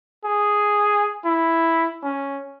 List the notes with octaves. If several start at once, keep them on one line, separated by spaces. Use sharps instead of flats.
G#4
E4
C#4